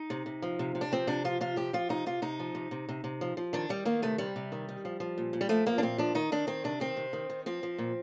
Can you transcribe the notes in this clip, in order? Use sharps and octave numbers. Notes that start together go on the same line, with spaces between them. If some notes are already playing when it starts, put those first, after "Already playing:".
Already playing: D#4
C3
C3
F3
C3
C3
D4
F3 C4
C3 D4
F3 F4
C3 F4
F3 G4
F3 F4
C3 D#4
C3 F4
C3 D#4
F3
C3
C3
C3
C3
F3
F3
D#3 D4
D#3 G3
D#3 A#3
C3 A3
C3 G3
C3
D#3
D#3
F3
F3
A#2
A#2
G3
F3 A3
F3 A#3
D4
A#2 C4
F3 D4
D#3 D#4
D#3 D4
D#3 C4
C3 D4
D#3 C4
C3
D#3
D#3
F3 C4
F3
A#2